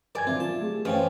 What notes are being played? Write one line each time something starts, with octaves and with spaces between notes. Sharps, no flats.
G2 A#4 D5 G#5 G#6
D#3 F#3 C4 F4 E5
F4 A5
A3 G4 G#4
F#2 E3 C4 C#4 B4 F5 G5